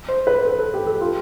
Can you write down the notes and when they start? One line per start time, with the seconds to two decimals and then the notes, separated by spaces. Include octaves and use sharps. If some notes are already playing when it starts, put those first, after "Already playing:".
0.09 C5
0.27 B4
0.45 A4
0.59 A4
0.74 G4
0.86 A4
1.01 F4